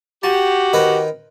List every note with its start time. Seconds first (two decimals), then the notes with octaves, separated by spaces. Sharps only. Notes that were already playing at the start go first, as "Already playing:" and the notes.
0.23 F#4 G4 A5
0.73 D#3 B4 C5